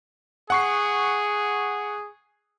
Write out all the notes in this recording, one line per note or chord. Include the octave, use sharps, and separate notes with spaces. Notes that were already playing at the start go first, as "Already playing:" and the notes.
G#4 F#5 C#6 C7